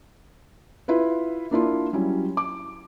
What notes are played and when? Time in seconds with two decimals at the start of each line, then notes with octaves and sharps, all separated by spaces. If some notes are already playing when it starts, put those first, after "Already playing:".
0.88 E4 F4 B4
1.51 A#3 D4 E4 F4
1.93 F#3 G3 C#4 E4
2.37 D6